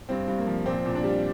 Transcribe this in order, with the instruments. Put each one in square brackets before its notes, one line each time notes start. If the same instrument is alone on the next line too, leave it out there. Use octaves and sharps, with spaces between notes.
[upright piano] G2 C4
G2
A#3
F3
A#2 C4
A#2
D4
G3